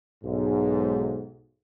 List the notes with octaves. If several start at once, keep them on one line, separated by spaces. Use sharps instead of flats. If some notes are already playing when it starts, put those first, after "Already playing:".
B1 G#2